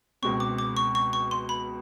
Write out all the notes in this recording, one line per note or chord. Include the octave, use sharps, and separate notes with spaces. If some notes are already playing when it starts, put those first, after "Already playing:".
C#2 B2 G#3 C4 C#6
D6
D6
C#6
C#6
C#6
C6
B5